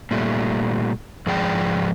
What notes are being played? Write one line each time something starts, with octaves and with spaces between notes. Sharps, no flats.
A#2 G3 A3
G#2 F3 G#4 D5 G5